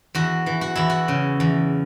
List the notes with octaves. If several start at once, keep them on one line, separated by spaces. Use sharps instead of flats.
E2 F#4
E3
F#4
E2 E4
F#4
C#3
E2